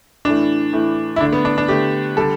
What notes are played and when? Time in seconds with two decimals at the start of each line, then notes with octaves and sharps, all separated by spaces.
0.25 A2 E3 A3 D4
0.73 A2 E3 A3
1.16 E4
1.20 D3 A3 D4
1.33 B3
1.45 D4
1.58 D4
1.68 D3 A3 G4
2.17 D3 G3 A4